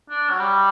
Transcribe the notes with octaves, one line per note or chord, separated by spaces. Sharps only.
D4
F#3
G3